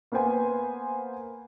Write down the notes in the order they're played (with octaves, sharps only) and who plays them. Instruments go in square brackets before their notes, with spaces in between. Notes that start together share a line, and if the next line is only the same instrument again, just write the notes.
[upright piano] A#3 B3 B4 C5 G#5